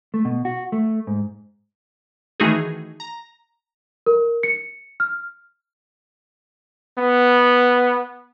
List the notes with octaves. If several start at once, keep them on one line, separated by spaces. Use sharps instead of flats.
A3
B2
F#4
A3
G#2
D#3 E3 A3 D#4 F#4 G#4
A#5
A#4
C#7
F6
B3